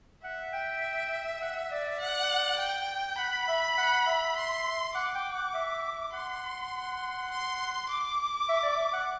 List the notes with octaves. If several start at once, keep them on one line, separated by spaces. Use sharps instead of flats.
E5 F#5
G5
F#5
D5
F#5
G5
F#5 B5
E5
F#5
E5
C6
F#5 D6
G5
F#5
E5
F#5 C6
C6
D6
E5
D5
E5
F#5